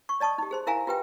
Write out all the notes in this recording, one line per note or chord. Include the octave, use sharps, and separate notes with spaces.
C#6
D5 D#5 A5 C#6 D#6
D#4 G4
G#4 C5 C6
E4 A#4 E5 F5 G#5 A#5
F4 G4 B4 E5 G5